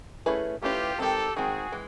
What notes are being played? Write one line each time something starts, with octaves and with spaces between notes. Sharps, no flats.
A3 C#4 E4 G#4 B4
A3 C#4 E4 F4 G4 G#4 B4
D#3 G#3 C4 G4 A4
D#3 G#3 C4 F#4 G#4
E3 G#3